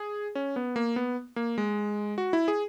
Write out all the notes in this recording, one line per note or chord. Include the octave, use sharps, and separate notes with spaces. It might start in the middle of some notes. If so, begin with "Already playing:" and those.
Already playing: G#4
C#4
B3
A#3
B3
A#3
G#3
F#4
E4
G#4